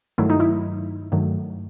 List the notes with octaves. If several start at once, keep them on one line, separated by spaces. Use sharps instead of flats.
G2 D#3 F#3 A3 E4
D#4
E4
G2 D#3 F#3 A3